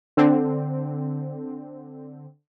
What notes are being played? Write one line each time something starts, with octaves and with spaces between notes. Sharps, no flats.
D3 C4